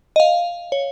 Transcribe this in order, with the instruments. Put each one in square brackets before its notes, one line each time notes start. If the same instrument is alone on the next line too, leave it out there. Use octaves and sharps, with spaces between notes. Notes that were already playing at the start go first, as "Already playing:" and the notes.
[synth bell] D#5
F5
C#5